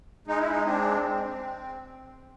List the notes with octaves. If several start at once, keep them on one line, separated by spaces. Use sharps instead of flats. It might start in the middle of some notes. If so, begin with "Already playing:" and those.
G#3 D#4
E4
D#4
C4 D4
C4